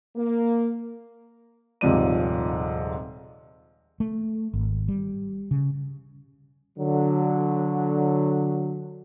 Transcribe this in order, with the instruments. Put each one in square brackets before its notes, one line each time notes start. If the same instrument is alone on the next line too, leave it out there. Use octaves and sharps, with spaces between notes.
[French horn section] A#3
[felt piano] D#1 G#2 C3 F3 D5 D#7
[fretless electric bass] A3
G#1
G3
C#3
[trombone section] D3 F#3